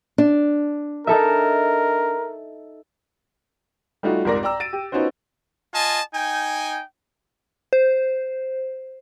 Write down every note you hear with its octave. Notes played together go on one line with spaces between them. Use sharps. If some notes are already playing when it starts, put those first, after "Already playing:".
D4
D#4 A4 A#4 E5
G3 A3 D#4 F4 F#4
C2 F2 G#2 A#4 D5 A#6
D5 G5 A#5 E6
A6 D7 D#7
G4
B3 C#4 D#4 F4 F#4 C5
F4 D#5 G#5 A5
D#4 G5 G#5
C5